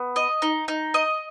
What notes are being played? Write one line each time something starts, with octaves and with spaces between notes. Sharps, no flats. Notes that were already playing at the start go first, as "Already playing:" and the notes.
Already playing: B3
D#5
D#4
D#4
D#5